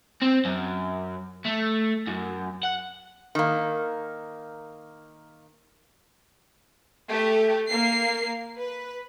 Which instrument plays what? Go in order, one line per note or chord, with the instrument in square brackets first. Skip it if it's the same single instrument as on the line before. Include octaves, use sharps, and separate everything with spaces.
[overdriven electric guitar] C4
F#2
A3
F#2
F#5
[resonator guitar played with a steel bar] D#3 A#3
[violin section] A3 G4
A#3 C7
B4